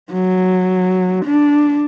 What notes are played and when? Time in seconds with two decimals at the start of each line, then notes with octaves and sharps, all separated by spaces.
0.13 F#3
1.25 D4